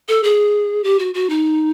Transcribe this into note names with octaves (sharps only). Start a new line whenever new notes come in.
A4
G#4
G4
F#4
F#4
D#4